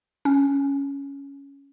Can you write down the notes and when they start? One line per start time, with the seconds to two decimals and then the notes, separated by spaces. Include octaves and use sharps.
0.25 C#4